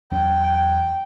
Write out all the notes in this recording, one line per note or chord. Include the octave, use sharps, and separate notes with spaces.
E2 F#3 C#4 G5